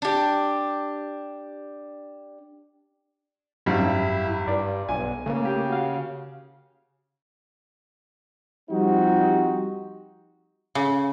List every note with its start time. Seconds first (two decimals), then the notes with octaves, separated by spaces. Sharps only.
0.02 D4 G4
3.66 G#1 F#2 G3 E4 F5
4.48 G2 D5
4.89 B1 G#5
5.26 C#3 A3 A#3
5.45 G4
5.70 F#4 F5
8.70 F3 G3 C4 D#4 F#4 G4
10.75 C#3